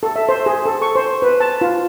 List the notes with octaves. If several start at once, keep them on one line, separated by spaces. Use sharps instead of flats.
A4
E5
C5
G#4
A4
C#6
C5
B4
A5
F4